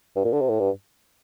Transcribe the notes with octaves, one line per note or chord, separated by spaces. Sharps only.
G2
A#2
D3
C3
A2
G2